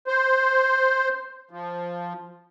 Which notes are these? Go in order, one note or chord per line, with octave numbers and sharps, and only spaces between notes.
C5
F3